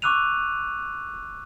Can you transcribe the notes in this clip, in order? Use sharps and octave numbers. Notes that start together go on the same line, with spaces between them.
C#6 D6 E6 F#6 D#7 F7